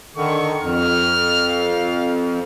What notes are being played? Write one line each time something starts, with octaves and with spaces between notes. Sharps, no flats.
D3 D#3 C#6
F2 F6
F5